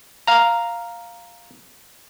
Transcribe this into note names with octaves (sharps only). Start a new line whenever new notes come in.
F5 A#5